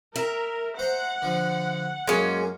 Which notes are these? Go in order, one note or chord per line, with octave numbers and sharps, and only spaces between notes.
A#4 E5
C5 F#5 A#5
D3 F3
F#2 G#3 A#3 C#4